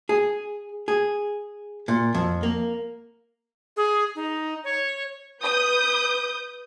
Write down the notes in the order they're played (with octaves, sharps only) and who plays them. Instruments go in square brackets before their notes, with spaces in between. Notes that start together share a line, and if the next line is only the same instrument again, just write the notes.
[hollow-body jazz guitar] G#4
G#4
A#2
F2
A#3
[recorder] G#4
D#4
C#5
[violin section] B4 D#6 G6